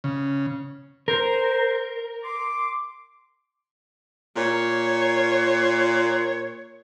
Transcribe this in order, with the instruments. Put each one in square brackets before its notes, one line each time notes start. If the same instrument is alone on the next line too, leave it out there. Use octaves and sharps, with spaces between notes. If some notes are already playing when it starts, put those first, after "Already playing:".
[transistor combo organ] C#3
[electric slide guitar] A#4 [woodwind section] C5
[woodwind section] C6 D6
[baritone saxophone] A#2 [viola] C#5